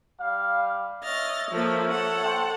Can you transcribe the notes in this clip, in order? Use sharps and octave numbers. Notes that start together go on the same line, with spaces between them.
G3 F5
C#5 D#5 E5 F6 A6
F3 A3 A#3
A4 F#5
C5 G5